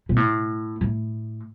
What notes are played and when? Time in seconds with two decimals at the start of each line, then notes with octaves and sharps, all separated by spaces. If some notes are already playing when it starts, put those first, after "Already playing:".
0.09 B2
0.16 A2
0.81 A2